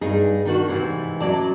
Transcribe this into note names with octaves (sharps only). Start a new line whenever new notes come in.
G2 D#4 G#4
D#3 D4 F#4
G#2 C3 E3
F#2 F#3 D5 A5